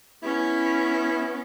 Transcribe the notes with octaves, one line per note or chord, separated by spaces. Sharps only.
B3 C#4 E4